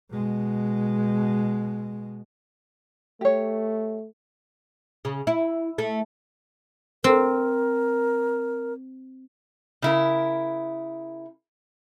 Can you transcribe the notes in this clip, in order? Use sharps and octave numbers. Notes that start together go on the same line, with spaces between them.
B2 G#3
A3 G4 C#5
C#3
E4
A3
C4 A#4
C#3 E4 A#4